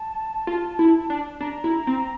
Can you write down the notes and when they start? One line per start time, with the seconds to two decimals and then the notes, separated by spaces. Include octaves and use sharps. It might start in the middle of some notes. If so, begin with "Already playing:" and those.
Already playing: A5
0.47 F4
0.79 E4
1.10 D4
1.40 D4 A#5
1.64 E4
1.87 C4